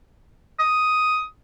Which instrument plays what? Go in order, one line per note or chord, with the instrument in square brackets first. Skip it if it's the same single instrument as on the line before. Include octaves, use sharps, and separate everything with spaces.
[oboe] D#6